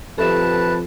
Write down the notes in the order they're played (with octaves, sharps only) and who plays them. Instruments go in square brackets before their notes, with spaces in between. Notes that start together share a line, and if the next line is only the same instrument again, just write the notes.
[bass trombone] F2 [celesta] G4 E5 E7 [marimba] A4 [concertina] B4 A5